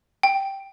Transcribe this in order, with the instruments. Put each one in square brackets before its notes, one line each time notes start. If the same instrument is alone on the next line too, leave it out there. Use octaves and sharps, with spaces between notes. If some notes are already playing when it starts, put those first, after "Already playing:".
[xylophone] G5